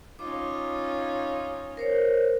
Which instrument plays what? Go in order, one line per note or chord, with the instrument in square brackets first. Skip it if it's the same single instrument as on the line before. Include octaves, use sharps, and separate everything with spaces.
[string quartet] C#4 D#4 F4 [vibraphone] D6
[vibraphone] A#4 C5 C#5